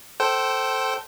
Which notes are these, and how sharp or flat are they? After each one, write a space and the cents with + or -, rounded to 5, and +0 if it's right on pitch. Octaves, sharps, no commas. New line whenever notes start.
A4 +0 C5 +5 G5 -25